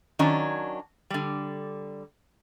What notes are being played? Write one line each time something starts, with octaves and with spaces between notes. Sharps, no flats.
D#3 F#3 C#4 D4
D3 G3